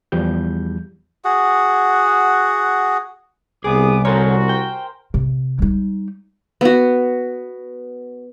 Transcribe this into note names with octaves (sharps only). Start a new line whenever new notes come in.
E2 F3 G3 G6
F#4 G#4 F#5
C2 B3 G#4 G#5 D6 D#6
C4 F#4 A4 A#4 C5 C#5
C5 G5
C3
G3 D#4
B3 F#4